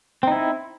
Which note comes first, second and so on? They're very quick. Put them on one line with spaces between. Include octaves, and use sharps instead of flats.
C4 D#4 E4